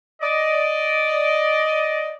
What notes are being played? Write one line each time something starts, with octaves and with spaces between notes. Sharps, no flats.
D5 D#5